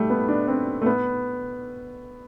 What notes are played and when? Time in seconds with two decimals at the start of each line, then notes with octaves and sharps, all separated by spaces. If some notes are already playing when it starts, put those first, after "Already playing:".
Already playing: G3 A3
0.10 B3
0.28 D4
0.48 C4
0.82 A3
0.86 B3